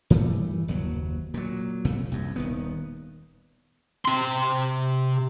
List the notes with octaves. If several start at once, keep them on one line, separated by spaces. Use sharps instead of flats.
G2 E3 G3 A3
F#1 D#2 F#3
A#2 F#3
F1 C2 A#2 A3
C2 F#2
D#1 D#3 B3
C3 C6